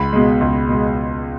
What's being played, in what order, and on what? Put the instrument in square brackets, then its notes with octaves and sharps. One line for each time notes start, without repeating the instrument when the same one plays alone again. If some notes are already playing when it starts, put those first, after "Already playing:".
Already playing: [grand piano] C#2 B5
B2 G#3
C#2
B2 G#3